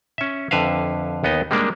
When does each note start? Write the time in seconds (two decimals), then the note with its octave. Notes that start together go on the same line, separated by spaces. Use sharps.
0.18 C#4 E5
0.51 F2 D3 B4 E5 F5
1.24 D#2 B3 D#4 D#5
1.51 G3 G#3 A#3 D4